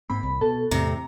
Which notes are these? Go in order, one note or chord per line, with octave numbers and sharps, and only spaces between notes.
G#2 A#3 C4 B5
C2
B2 A4
E2 A2 C3 A3 A#5